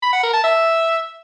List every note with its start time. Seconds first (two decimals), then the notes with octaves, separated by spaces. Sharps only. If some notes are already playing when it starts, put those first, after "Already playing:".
0.03 B5
0.13 F#5
0.23 A#4
0.34 A5
0.44 E5